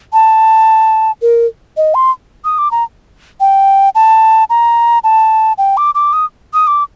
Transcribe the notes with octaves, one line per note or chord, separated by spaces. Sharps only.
A5
A#4
D#5
C6
D#6
D6
A#5
G5
A5
A#5
A5
G5
D6
D6
D#6
D#6
D6